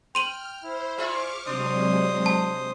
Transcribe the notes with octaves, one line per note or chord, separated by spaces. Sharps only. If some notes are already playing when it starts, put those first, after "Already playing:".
G5 C6 F6 D#7 F#7
E4 C5
F4 G#4 E5 C#6 D6 F6
C3 F#3 G#3 D4 C5 D#6
A5